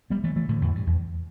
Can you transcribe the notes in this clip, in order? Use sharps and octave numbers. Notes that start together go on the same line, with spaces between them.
G3 B3
E3 A3
E3 A3
A2 D3
E2 A2
G2
E2